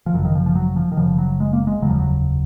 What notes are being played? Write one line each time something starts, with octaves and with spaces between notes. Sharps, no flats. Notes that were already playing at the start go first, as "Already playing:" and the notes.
F3
G#1 F#2 C#3 F#3
D#3
F3
F3
F#3
F3
D#3
F#1 F#2 C#3 F3
F#3
G#3
A#3
G#3
F1 D#2 C#3 F#3
F3
F#3